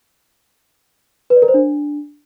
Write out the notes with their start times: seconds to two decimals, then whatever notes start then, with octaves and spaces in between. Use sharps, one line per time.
1.30 B4
1.36 D5
1.42 A#4
1.48 C5
1.54 D4